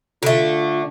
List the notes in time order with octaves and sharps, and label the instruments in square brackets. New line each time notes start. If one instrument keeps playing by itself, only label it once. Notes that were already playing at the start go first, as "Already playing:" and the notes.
[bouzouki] D3 A3 [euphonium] F4